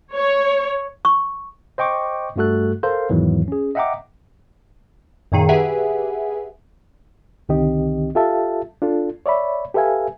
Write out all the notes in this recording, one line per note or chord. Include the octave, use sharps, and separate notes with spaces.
C#5
C#6
C5 D#5 G5 C#6 D6
G2 G3 A3 F#4 A4 F#6
A4 A#4 C5 F5
E2 G#2 D#3 E3 F#3
C#4 G#4
D#5 E5 F#5 G5 A#5 D6
F#2 A#2 D#3 G#4
G4 G#4 B4 E5 F#5 G#5
C2 D3 D#3 C4 G4 D#5
F4 G4 A4 E5 F5 A5
D4 F4 A4
C#5 D5 E5 B5
G4 A4 B4 E5 F5 G#5